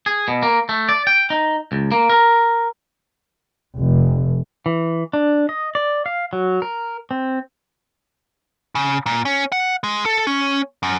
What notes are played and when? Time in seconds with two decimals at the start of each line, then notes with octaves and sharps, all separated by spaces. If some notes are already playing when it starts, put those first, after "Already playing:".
0.06 G#4
0.28 B2
0.43 A#3
0.69 A3
0.89 D5
1.07 G5
1.30 D#4
1.72 C#2
1.92 A#3
2.10 A#4
3.78 F1
4.66 E3
5.13 D4
5.49 D#5
5.75 D5
6.06 F5
6.33 F#3
6.62 A#4
7.11 C4
8.75 C#3
9.06 A#2
9.25 C#4
9.52 F#5
9.84 G#3
10.06 A4
10.27 C#4
10.83 F#2